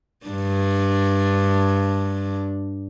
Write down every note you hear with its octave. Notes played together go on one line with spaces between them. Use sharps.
G2 D4